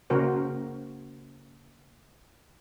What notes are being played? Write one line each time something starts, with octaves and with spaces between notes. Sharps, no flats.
C#3 A#3 F#4 A#4 C5